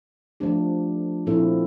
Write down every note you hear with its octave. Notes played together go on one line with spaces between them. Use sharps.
F3 A3 D4 G4
A#2 F3 C4 E4 A4